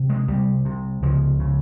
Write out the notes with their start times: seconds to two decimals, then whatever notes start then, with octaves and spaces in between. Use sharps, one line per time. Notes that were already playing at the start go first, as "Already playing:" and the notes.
Already playing: C3
0.09 G#3
0.28 C2 G3
0.65 C3
1.02 C#2 F3
1.40 C#3